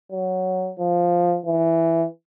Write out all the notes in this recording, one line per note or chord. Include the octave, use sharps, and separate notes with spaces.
F#3
F3
E3